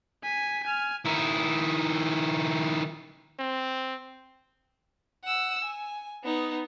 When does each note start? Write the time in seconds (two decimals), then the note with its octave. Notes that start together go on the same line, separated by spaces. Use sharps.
0.23 G#5 B6
0.64 G#5 F6
1.05 D#3 E4
3.39 C4
5.24 F#5 E6
5.64 G#5
6.24 B3 D#4